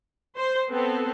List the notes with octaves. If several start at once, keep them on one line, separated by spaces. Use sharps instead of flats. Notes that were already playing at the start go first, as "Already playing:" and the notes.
C5
B3 C4 A4